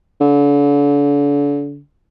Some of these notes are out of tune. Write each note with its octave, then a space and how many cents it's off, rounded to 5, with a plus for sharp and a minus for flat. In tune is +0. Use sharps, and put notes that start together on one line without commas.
D3 -40